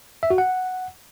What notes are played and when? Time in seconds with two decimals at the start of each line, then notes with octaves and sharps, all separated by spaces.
0.23 E5
0.30 F#4
0.38 F#5